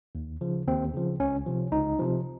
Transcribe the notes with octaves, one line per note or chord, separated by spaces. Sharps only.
D#2
C#3 F3
D#2 C4
C#3 F3
C#2 C#4
C3 F3
C#2 D#4
C3 F3